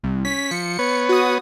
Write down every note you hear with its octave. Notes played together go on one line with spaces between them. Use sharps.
C2
C#4 B6
F3 C#7
B3 B4 C#5
F#4 D#6